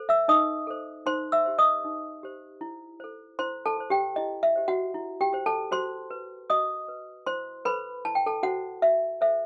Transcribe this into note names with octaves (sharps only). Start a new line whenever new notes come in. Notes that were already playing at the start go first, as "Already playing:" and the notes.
Already playing: A4 C5
E5 E6
D#4 D#5 D#6
A4 C5
D#4 C5 C6
E5 E6
G4 C5
D#5 D#6
D#4
G4 C5
E4
A4 C5
E4 C5 C6
A4 A5
A4 C5
G4 G5
E4 D#5
E5
G4 C5
F#4 F#5
E4
G4 G5
G4 C5
A4 A5
F#4 C5 C6
B4
F#4 D#5 D#6
B4
E4 C5 C6
A4 B4 C5 B5
E4 A5
G5
A4 A5
F#4 A4 C5 F#5
F#4 E5
A4 C5 E5